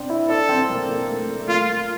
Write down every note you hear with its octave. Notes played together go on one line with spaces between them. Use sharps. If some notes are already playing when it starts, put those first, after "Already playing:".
Already playing: C4 D4
E4
D4 A4
C4
A#3
A#3
A3
A3
A3
A#3 F4